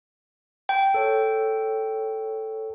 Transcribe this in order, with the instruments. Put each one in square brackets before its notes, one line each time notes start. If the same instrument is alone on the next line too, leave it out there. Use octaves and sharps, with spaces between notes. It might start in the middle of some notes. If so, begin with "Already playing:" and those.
[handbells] G5
[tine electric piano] A4 C#5